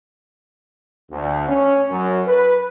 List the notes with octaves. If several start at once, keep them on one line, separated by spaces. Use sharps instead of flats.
D2
C#4
F#2
B4